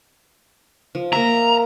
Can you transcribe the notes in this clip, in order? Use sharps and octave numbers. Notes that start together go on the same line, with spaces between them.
F3
A#3 E5 A#5